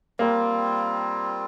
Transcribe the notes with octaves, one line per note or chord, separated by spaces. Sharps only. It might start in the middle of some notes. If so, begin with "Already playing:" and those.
G3 A#3 C4 F4